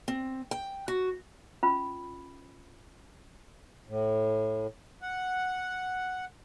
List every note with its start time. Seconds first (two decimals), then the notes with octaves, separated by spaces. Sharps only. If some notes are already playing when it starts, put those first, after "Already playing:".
0.08 C4
0.51 G5
0.88 F#4
1.63 C#4 F4 B5
3.88 A2
5.02 F#5